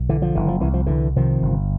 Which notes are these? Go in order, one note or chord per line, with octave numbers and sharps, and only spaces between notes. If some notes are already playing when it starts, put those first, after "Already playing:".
Already playing: B1
D3 E3
F3
F#1 E3
F3
C2 E3
F3
C2 D3 E3
C3 D#3 F3
G1